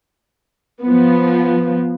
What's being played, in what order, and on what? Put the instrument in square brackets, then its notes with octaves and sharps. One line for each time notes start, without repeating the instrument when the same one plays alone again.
[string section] F3 B3